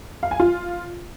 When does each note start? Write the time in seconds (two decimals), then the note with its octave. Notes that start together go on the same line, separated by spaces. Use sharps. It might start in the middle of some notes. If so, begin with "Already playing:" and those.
0.23 F5
0.31 G#5
0.40 F4